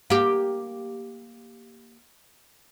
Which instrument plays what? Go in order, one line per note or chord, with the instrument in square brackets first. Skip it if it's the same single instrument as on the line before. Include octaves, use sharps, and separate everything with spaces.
[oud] A#3 G4